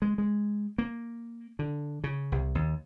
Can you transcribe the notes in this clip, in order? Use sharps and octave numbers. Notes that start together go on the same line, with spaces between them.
G#3
G#3
A#3
D3
C#3
C2
D#2